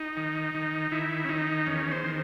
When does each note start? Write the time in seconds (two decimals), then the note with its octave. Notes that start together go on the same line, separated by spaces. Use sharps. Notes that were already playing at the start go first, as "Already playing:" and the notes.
Already playing: D#4
0.17 D#3
0.55 D#3
0.91 D#3 E4
1.25 C#4
1.29 D#3 D#4
1.67 E2 C#4
1.91 C5
2.04 D#3